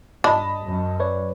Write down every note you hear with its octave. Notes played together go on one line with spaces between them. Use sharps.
G2 D4 D#5 A5 B5
F#2
B4 C#5 D5